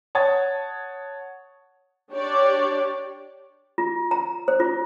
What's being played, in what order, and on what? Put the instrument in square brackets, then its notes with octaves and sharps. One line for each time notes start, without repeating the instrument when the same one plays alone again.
[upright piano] C#5 F#5 A5 D#6 G#6 A6
[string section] D4 G4 C#5 D5
[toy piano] F4
A#5
C5
F4